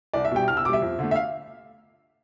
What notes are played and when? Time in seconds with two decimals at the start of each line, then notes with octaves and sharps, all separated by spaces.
0.14 C2 D5
0.25 E5
0.31 B2 G3 G5
0.48 C2 F6
0.57 E6
0.65 B2 D6
0.69 G3 E5
0.82 F2
0.99 D3 A3
1.11 E5
1.16 F5